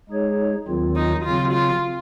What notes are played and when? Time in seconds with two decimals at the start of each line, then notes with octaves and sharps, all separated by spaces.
0.09 G#3 D#4 G#4 C#5
0.67 D#2 D#3 F#3 C4 F4
0.96 D#4
1.25 C#3 F#3 C4 F4
1.53 F4